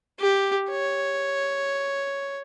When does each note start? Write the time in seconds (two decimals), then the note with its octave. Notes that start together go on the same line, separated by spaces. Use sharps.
0.20 G4
0.70 C#5